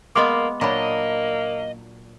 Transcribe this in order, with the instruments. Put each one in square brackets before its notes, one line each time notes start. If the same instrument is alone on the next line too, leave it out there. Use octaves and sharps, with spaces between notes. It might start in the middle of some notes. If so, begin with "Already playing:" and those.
[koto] G#3 B3 F5 [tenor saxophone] A#3 [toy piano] D#5 C6 D6
[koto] A#2 F#3 D4 [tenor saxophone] A#3 [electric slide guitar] D#5 [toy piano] A#5 B5